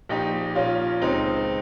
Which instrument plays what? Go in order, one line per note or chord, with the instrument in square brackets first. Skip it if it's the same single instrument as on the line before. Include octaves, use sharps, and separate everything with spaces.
[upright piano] A#1 D#4 G4
A#2 C#4 F4
C#2 C4 D#4